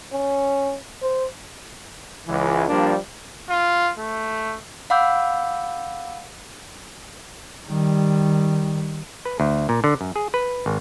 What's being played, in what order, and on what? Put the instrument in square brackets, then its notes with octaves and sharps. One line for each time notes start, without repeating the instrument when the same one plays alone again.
[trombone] C#4
C5
[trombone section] C#2 E3
F3 G3 A#3 D4
[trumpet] F4
A3
[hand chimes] F5 F#5 B5 D6 E6 G6
[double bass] D#3 G3
[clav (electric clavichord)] B4
D2
A#2
D3
F#2
G#4
B4
G#1